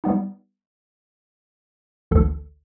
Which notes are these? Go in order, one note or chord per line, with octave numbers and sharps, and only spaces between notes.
G3 B3 D#4
A1 D2 D3 A4